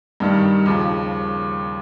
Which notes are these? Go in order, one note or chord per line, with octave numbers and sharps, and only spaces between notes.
G2 D#3 G3
D#2 C#3 F3